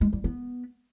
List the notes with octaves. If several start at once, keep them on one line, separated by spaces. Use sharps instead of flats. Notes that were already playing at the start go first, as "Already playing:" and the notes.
G#3
G3
B3